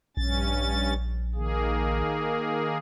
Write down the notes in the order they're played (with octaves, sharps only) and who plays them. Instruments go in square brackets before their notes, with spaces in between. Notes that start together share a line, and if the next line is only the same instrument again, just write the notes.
[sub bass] A#1 [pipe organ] G2 C#4 A6
[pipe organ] D#3 A#3 G#4